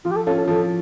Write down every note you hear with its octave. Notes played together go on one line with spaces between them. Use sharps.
F3 F4
G4
A4
C#4 F4 A4
A4
F3 A4